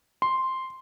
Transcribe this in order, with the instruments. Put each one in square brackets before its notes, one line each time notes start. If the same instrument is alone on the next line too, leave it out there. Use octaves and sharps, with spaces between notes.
[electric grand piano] C6